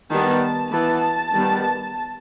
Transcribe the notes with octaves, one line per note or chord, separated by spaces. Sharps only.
D#3 G3 B3 A5
E3 B3 A5
D#3 G3 B3